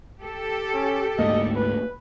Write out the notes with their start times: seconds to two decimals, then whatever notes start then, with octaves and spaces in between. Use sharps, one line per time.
0.19 G4 A4
0.74 C#4
1.19 D2 G#2 A#3 D#5
1.56 B4